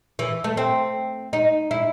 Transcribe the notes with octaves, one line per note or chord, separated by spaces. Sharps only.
E3
A3
C4
D#4
E4